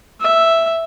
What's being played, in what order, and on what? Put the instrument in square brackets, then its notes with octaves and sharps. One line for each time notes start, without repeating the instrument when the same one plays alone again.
[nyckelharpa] E5